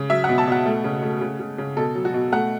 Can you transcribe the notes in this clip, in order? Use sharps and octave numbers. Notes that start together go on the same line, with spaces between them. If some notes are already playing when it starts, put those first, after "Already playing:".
Already playing: C#3
F#3 E5
F#5
B2
A5
B2 F#5
A3
C#3
A3
C#3
C#3
C#3
B2 A4
F#3
F#4
B2
A3 F#5